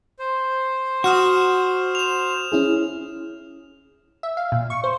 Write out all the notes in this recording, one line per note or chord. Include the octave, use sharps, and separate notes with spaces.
C5
F#4 D#6 F6 E7
E7 F7
C#4 E4 G#4
E5
F5
A#2
C#6
C5